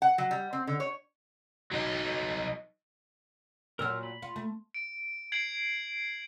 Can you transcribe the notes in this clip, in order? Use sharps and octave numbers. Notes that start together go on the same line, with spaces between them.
F#5
F#3
G3
C4
D3
C#5
F#3 D#4
A#2 F#3 A#4 E6 F6
B5
F4
A3
D7
G#6 C7 D7 F#7